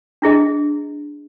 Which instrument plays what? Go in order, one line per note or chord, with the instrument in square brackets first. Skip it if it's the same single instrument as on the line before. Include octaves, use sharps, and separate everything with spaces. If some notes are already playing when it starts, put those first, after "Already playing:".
[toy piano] D4 E4 G#4 D#5